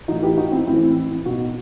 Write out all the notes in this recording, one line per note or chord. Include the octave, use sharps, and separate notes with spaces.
A2 E3 D#4 F#4
E4 G4
D#4 F#4
C4 E4
A2 E3 C4 E4
B2 D#4 F#4